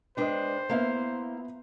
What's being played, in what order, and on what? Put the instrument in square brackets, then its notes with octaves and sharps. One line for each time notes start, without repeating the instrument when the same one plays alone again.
[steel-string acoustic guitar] G#3 D4 B4 [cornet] C5 [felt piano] D#5 G5
[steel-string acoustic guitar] A#3 E4 F5 [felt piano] B3 B4 E5